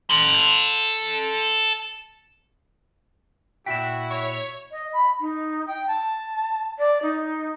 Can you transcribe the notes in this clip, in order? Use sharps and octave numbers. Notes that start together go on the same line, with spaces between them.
A4 C6
A#2 E4 F#4 G5 B6 E7
C#5
D#5
B5
D#4
G5
A5
D5
D#4